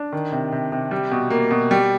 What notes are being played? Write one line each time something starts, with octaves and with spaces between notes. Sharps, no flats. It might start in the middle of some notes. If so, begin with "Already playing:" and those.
Already playing: D4
D#3
C3
C3
C3
G3
B2
A#3
B2
G3